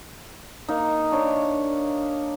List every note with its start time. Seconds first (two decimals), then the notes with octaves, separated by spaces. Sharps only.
0.69 A#3 D#4
1.12 D4 C#5